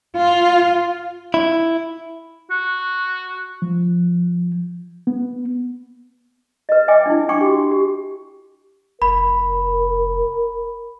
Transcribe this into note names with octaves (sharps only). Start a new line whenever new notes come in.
F4
E4
F#4
F3
B3
B4 D#5
D#5 E5 G5 G#5 D6
D4 E4
D4 G5 G#5 C#6 D6
F#4 G4
G4
F1 A#4 B5